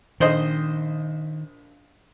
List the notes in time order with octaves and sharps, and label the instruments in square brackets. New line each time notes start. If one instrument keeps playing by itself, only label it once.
[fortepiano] A#1 C5 D#5 [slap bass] D#3